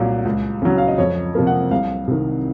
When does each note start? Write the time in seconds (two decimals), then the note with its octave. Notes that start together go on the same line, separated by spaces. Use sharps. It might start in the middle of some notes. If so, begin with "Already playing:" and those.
Already playing: C2 A#2 F#3
0.25 C#2
0.62 C#3 F#3
0.78 F5
0.88 D#5
0.98 F2 C#5
1.35 C3 F3 A#3
1.47 F#5
1.71 C2 F5
2.08 C3 D#3